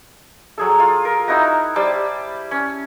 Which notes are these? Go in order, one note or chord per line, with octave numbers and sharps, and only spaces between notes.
F#3 G#4 A4
F4
A#4
D#4 E4 F#4 A#5
G3 C5 A5 E6
C#4